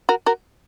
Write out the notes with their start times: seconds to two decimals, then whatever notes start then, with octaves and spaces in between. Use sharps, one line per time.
0.09 F#4 A#4
0.26 F#4 A#4